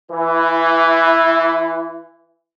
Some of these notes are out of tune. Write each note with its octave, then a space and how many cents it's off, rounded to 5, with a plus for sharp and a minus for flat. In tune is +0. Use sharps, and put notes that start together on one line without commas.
E3 +0 E4 +30